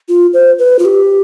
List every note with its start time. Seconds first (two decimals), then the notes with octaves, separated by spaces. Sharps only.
0.09 F4
0.34 C5
0.59 B4
0.79 F4
0.85 G4